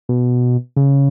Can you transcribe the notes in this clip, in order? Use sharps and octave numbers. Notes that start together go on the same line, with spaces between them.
B2
C#3